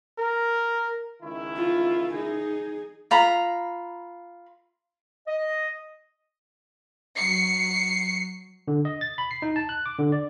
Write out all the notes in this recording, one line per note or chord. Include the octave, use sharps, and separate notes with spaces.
A#4
C#2 D#3 E4
F4
D#4 G#4
F4 A#5 B5
D#5
F#3 C7 C#7
D3
D#5
A6
B5
C7
D#4
A5
F#6
D6
D3
D5